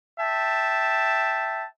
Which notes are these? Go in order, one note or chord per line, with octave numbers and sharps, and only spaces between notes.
E5 G5 A5